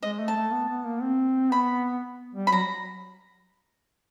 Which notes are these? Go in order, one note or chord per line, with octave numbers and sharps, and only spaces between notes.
G#3 D#5
A3
A5
A3
B3
B3
A#3
C4
B3 B5
G3
B5
F#3 A#5